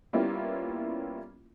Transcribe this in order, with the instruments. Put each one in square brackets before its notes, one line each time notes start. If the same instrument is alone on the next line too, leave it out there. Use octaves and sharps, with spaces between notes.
[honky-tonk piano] G3 A#3 B3 C#4 E4 F4